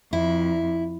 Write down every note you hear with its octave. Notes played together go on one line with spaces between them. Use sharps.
F2 E4